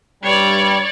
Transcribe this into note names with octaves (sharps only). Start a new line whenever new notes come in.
G2 G3 C#5 D5